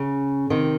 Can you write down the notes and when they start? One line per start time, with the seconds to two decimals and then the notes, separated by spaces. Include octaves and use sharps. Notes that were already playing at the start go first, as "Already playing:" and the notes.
Already playing: C#3
0.50 C3 D#3